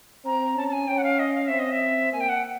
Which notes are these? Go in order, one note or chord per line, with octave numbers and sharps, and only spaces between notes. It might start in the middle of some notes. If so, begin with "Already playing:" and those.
C4 A#5
C#4 A5
A5
G#5
C#4 G5
F#5
F5
D#5
F5
C4 E5
D#5
E5
A#3 G#5
G5
F#5